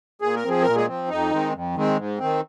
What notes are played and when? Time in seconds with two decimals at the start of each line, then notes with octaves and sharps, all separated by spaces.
0.22 A#2 G#4
0.36 A#4
0.44 F3 C4 G#4
0.62 A#2 A#4
0.76 G#3 G#4
0.88 F3 C4
1.09 F2 D#4
1.31 D#3 G#3 C4
1.53 F2
1.75 D#3 G#3 C4
1.97 G#2
2.19 D#3 C4